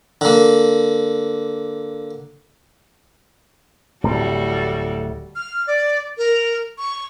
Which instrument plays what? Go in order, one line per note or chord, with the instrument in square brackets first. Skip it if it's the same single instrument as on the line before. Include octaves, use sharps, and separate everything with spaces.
[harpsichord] D3 A#3
[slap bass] D1 A2 [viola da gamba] G3 F#4 A4
[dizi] F6
D5
A#4
C#6